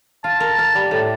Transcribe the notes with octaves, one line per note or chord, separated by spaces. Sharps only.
F4 A5
A#4
A#4
G3
A2 A5